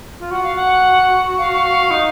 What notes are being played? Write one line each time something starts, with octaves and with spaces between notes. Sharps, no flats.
F4
F#4 F#5
F5
F#5
F5
D#4